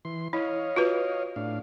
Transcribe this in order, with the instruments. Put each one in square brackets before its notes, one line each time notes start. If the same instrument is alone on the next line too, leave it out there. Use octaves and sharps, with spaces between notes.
[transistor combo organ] E3 C6
[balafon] E4 [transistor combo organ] C#5 D#5 F5
[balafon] F4 F#4 B4
[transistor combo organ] A2 D4 F5